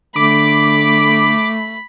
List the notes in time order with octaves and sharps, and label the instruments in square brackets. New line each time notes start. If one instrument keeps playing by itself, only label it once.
[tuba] D3 [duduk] A3 [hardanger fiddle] B5 [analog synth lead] D6